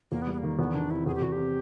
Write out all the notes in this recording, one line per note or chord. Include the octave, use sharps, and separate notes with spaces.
E2 A#3
B3
G3
B3
A#3
D#3
E2 B3
D#3 D4
C3 E4
E2 G#4
G4
E2 F#4
G4
C3